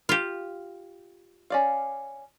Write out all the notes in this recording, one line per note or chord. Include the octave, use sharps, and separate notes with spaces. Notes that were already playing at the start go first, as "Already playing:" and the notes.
F4 G4
C#4 D5 F5